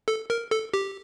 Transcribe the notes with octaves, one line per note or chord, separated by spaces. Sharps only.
A4
A#4
A4
G4